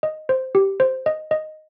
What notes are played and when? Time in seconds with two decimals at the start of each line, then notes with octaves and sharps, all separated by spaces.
0.03 D#5
0.29 C5
0.55 G4
0.80 C5
1.06 D#5
1.31 D#5